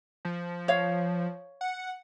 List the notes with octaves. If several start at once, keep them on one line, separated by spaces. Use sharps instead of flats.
F3
C#5 F5
F#5